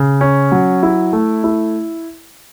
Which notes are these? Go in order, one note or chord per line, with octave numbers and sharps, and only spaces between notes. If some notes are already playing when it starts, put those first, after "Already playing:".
Already playing: C#3
C#4
F#3
E4
A3
E4